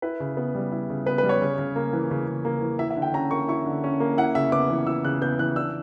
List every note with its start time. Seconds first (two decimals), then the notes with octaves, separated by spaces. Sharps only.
0.02 E4 B4
0.20 C#3
0.37 B3
0.55 G3
0.72 E4
0.90 C#3
1.06 B3 B4
1.18 B4
1.23 G3
1.29 C#5
1.41 C#3
1.58 C#3
1.76 A#3
1.93 E3
2.11 C#3
2.28 C#3
2.45 A#3
2.62 E3
2.79 E4 E5
2.90 E5
2.96 D3
3.02 G5
3.14 C#4 A#5
3.31 A#3 C#6
3.48 E4 C#6
3.66 D3
3.84 C#4
4.00 A#3
4.17 E4 F#5
4.35 C#3 E5
4.52 B3 D6
4.70 E3
4.87 E4 E6
5.04 C#3 F#6
5.21 B3 G6
5.39 E3 F#6
5.56 D4 E6